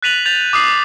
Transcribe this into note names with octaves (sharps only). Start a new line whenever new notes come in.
F#6 A6 B6 D#7 F7 F#7
G6 A6 F7
D6 D#6 F#6 C7 F7 F#7